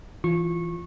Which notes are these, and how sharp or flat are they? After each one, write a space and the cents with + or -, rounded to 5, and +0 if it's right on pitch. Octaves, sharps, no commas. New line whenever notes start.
E3 +10 F4 +0 C#6 -20